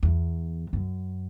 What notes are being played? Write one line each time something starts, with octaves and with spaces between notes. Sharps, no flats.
E2
F#2